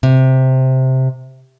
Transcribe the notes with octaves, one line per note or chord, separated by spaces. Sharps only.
C3